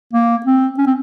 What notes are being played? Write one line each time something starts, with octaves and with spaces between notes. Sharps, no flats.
A#3
C4
C#4
C4